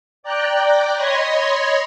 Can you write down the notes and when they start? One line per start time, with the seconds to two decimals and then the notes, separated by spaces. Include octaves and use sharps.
0.23 D5 G5 A#5 F#6
0.96 C#5 D#5 B5 C6 G#6 A#6